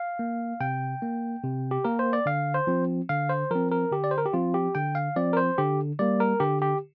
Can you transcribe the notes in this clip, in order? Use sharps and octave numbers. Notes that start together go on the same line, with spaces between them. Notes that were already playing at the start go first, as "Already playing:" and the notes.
Already playing: F5
A#3
C3 G5
A#3
C3
G4
A#3 A#4
C5
D5
D3 F5
C5
F3 C4
D3 F5
C5
F3 C4 A#4
A#4
D3 G4
D5
C5
A#4
G4
F3 C4 F4
G4
D3 G5
F5
F3 C4 D5
A#4
C5
D3 G4
G3 A#3 D5
A#4
D3 G4
G4